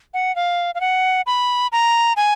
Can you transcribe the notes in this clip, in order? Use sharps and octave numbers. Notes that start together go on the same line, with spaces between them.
F#5
F5
F5
F#5
B5
A#5
G#5